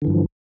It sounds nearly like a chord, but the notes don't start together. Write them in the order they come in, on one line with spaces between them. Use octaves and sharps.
D3 E3 G2 F3